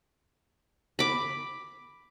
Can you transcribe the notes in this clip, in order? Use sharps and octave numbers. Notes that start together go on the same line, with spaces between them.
B5 D6